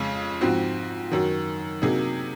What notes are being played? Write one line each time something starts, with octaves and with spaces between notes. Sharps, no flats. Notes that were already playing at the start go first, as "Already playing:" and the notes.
Already playing: F2 C#3 G#3
G#2 F3 C4 F#4
F#2 D#3 F#3
C3 F#3 A#3 D#4 G#4